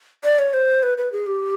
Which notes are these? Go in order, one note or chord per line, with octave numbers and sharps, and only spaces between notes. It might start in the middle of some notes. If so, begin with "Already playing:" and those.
D5
C#5
C5
B4
B4
G#4
G4